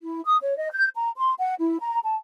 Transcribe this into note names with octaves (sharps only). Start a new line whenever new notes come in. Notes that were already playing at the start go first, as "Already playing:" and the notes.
E4
D#6
C#5
D#5
G6
A#5
C6
F#5
E4
A#5
A5